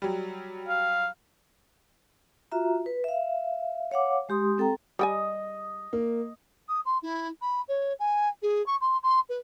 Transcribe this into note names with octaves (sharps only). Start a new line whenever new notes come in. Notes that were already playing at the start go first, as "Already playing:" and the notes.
F#3 G3
F5
F4 F#4 E5 A#5
B4
E5 F5
C#5 F5 F#5 D6
G#3 G4 C6 D#6
C4 A4 G5 A#5
G3 D#5 G5 G#5
A#3
D#6
C6
E4
B5
C#5
G#5
G#4
C#6
C6
C6
B4